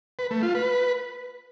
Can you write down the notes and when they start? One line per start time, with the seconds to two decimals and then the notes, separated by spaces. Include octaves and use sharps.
0.19 B4
0.31 A3
0.43 F4
0.55 B4